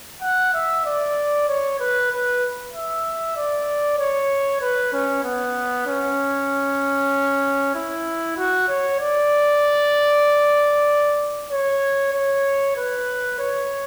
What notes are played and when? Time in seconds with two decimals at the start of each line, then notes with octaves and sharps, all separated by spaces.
0.22 F#5
0.54 E5
0.85 D5
1.48 C#5
1.80 B4
2.11 B4
2.73 E5
3.36 D5
3.98 C#5
4.61 B4
4.93 C#4
5.24 B3
5.87 C#4
7.75 E4
8.37 F#4
8.68 C#5
9.00 D5
11.52 C#5
12.13 C#5
12.77 B4
13.39 C#5